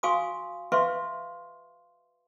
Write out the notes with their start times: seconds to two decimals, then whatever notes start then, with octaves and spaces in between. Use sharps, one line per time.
0.03 F#4 F5 G#5 C6 C#6 D#6
0.72 B4 E5 F5 C6 C#6